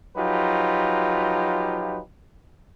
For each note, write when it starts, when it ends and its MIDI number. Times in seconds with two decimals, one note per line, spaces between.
0.17 2.00 53
0.17 2.00 54
0.17 2.00 63
0.17 2.00 65
0.17 2.00 67
0.17 2.00 71